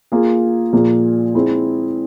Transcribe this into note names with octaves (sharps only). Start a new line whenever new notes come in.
A#3 F4 G#4
A#2 F3 A#3 F4 G#4
G#3 C4 E4 G#4